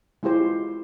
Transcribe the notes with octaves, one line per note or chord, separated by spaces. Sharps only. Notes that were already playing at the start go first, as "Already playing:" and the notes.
G#3 E4 F4 G4 C5